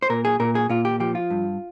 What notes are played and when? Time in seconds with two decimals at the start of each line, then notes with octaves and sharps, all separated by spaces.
0.02 C5
0.10 A#2 A#4
0.25 G#4
0.40 A#2 A#4
0.55 G#4
0.69 A#2 F4
0.85 G4
1.00 F3 G4
1.15 F4
1.30 G2